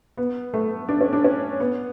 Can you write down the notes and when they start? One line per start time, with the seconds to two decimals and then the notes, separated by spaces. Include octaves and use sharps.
0.17 B3
0.54 A3
0.89 D4
1.01 C#4
1.13 D4
1.24 C#4
1.60 B3